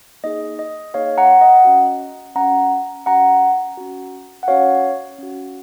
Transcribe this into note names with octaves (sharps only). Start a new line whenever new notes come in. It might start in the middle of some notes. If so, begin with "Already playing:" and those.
A#3 D#4 G#4 D#5
D#5
A#3 D#4 G#4 C#5 F5
F#5 A#5
D#5 F#5
C#4 F#4
C#4 F#4 F#5 A#5
C#4 F#4 F#5 A#5
C#4 F#4
F#5
C#4 F#4 C#5 F5
C#4 F#4